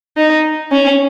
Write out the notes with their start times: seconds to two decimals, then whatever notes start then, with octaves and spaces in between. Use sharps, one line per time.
0.17 D#4
0.72 C#4